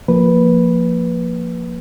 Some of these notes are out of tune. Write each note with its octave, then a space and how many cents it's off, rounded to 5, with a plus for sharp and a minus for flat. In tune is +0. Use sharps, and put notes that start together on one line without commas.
F3 +5 A#3 +0 B4 +0